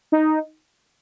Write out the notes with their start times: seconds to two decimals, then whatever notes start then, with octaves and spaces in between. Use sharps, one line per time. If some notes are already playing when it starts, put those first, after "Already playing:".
0.12 D#4